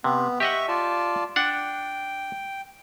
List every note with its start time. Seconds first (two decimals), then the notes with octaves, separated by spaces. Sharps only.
0.04 C3 B3
0.40 G4 D#5 E5 F#5 C#6
0.68 F4 D5 A5
1.36 D4 F#5 G5